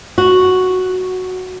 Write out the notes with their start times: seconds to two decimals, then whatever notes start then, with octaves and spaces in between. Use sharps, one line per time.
0.18 F#4